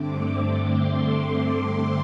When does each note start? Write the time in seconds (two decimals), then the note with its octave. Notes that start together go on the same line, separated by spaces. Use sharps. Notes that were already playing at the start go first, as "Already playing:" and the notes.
Already playing: G2 D3 A3 C4 D6
0.66 C6